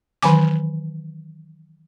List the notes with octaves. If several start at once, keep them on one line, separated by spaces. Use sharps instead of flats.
D#3 E3 F#3 G#5 D6